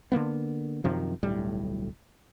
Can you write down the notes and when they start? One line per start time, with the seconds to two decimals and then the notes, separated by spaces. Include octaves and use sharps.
0.12 D3 F3 A#3 B3
0.84 F#2 C3 D#3 F3
1.23 D1 B1 A2 G3